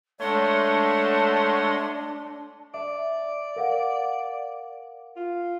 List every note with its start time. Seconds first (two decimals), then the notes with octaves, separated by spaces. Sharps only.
0.20 G#3 A3 D4 C#5 F#5 C6
2.74 D5 E5
3.56 A#4 F5 F#5
5.16 F4